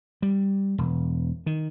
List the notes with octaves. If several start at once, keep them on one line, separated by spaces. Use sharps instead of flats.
G3
E1
D#3